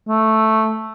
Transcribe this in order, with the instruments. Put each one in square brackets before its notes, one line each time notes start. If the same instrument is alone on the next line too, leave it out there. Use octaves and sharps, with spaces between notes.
[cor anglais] A3